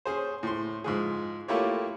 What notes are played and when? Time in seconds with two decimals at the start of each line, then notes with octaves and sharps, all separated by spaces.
0.05 C#4 G#4 C5
0.43 A2 C6
0.84 G#2 F3 G#4
1.48 A3 A#3 E4 F4 G4 C#5